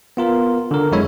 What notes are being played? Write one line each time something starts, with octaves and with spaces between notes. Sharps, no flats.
B3 F4 A#4
D3 A#4
F2 F#3 G#3 E4 C#5 E5